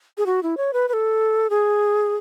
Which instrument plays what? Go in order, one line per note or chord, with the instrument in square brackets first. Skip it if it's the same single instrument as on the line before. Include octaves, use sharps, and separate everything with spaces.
[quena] G#4
F#4
E4
C#5
B4
B4
A4
G#4